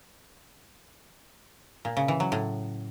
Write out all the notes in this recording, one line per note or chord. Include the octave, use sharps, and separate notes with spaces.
A#2
C#3
E3
F#3
A2